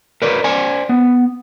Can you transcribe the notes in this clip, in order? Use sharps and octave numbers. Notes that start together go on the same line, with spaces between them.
A#4 B4 D5
C5 D5 G#5
B3